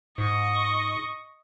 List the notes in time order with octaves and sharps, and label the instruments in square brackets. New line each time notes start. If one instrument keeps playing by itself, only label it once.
[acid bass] G#2 [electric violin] D#5 C#6